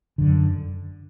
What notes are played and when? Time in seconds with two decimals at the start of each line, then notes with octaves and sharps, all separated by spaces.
0.18 F#2 D3